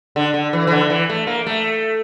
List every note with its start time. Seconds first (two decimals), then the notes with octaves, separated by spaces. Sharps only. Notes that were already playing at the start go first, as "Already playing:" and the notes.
0.16 D3
0.34 D3
0.53 E3
0.67 E3
0.72 D3
0.90 E3
1.10 A3
1.27 A#3
1.47 A3